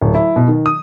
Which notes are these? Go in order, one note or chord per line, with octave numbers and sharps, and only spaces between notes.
D1
E4
B2
D#3
D#6